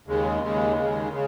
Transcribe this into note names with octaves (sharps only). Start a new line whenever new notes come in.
D#2 C#3 G#3
D#2 C#3 G#3
D#2 C#3 G#3
C#3